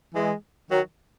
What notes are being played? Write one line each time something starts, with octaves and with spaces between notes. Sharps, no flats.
E3 G#3
D#3 F#3